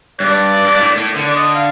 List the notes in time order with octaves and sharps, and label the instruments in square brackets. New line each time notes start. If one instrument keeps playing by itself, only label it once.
[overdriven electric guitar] G2 [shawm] D5
[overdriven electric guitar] G2
A2
A2
D3
[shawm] D5
D#5
F5